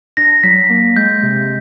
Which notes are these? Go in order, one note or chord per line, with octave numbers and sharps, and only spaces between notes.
D4 A#6
F#3 B6
A#3
G#3 G6
C3